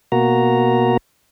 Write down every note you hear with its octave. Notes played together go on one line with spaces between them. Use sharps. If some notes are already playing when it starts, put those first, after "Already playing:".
B2 A#3 F#4 A#5